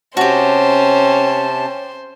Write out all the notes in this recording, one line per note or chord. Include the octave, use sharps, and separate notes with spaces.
C3 C#4 F#4 G4 C5 A5